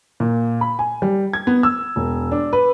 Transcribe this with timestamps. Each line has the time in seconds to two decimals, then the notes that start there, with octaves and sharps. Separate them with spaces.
0.20 A#2
0.61 B5
0.79 G#5
1.02 G3
1.33 G#6
1.47 B3
1.63 E6
1.96 E1
2.32 D4
2.53 B4